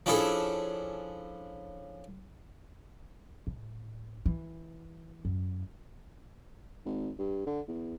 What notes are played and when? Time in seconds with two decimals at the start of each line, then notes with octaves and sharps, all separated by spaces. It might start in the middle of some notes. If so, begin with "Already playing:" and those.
0.06 F3 C#4 D4 E4 G#4 A4
3.47 A2
4.26 E3
5.25 F#2
6.85 G#1
7.19 G2
7.47 D3
7.68 E2